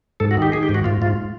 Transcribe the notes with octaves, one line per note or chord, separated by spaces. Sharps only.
G#2 A4
F#4
D#3 G4
D#3 G#4
G4
G#2
F#4
G#2 F4
G#2 F4